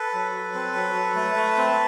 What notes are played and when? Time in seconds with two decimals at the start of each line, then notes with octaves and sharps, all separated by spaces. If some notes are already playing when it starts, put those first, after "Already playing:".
Already playing: A4 B4
0.14 F#3
0.35 F#3
0.54 C4
0.75 F#3
0.95 F#3
1.15 A3
1.35 A3
1.57 C4